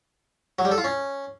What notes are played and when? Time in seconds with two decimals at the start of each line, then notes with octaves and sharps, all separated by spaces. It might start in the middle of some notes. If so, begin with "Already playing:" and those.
0.59 F#3
0.65 G3
0.71 A4
0.78 F4
0.84 C#4